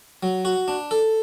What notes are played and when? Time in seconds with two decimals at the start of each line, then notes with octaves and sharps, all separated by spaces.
0.23 F#3
0.45 F#4
0.68 D4
0.91 A4